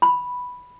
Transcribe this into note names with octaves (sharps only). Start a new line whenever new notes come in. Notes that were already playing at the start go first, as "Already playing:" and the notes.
B5